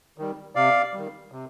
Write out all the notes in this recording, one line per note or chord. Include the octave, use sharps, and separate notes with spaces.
D#3 G3
C3 D5 F5
D#3 G3
C3